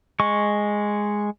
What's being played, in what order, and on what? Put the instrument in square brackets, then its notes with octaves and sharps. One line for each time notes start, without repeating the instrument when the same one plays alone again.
[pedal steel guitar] G#3 C#6